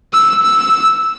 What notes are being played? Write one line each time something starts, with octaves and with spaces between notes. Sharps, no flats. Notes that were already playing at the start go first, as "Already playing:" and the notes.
E6
E6